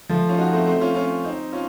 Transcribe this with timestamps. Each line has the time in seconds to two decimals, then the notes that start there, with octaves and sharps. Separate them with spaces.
0.09 F3 A3
0.29 C#4 F4
0.38 D#4 F#4
0.53 A3 C4
0.67 A3 C4
0.81 C#4 F4
0.95 C#4 F4
1.25 C4 D#4
1.53 C#4 F4